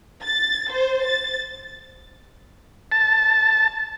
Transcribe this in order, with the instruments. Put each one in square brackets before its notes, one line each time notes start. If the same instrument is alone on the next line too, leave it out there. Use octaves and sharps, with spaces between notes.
[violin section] A6
C5
A6
[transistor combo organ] A5